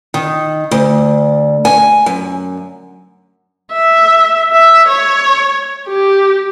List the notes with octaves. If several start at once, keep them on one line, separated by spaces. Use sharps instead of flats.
D#3
D2
G#5
F#2
E5
E5
C#5
G4